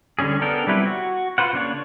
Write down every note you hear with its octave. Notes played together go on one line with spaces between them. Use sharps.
D3 G3 C#4 G#4
B3 D4 A4 A#4 G5
F#3 G3 C4 E4 B4
F#4
F4 B4 C5 F#5
C#3 A#3 D4 C#5